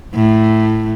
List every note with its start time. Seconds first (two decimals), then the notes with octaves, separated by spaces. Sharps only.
0.14 A2 A3